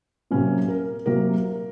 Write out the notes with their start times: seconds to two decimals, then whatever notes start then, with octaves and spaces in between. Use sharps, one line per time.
0.31 C3 F#3 A#3 C#4
0.68 A#4
1.06 C3 F#3 A#3 A#4